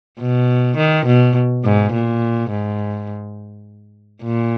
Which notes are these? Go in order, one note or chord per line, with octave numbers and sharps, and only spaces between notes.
B2
D#3
B2
G#2
A#2
G#2
A#2